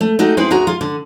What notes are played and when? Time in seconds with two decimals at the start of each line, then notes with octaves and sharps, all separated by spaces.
0.01 A3
0.19 A3 D#4 F#4 G4
0.37 C4 E4 G#4 B4 C5
0.51 D2 F#4 G#4 A#5
0.67 F4
0.81 D3